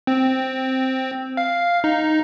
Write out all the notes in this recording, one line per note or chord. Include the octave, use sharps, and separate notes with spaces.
C4
F5
D#4